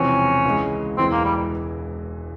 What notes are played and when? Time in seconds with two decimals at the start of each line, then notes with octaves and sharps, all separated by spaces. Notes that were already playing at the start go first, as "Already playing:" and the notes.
Already playing: E1 E2 C3 F3 C4 C#4
0.45 C#2 C#3 E3 G#3
0.97 E1 E2 E3 G#3 C4
1.12 A#3
1.24 G3